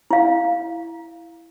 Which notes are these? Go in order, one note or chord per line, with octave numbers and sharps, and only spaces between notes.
E4 F5